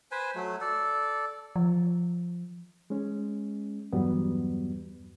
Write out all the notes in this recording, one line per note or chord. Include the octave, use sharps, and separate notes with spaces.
B4 C5 G#5
F#3 A3
A4 D5
F3
G#3 C#4
E2 G2 F#3 G3 B3